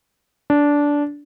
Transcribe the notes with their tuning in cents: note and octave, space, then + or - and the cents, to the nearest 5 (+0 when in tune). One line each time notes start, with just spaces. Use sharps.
D4 -15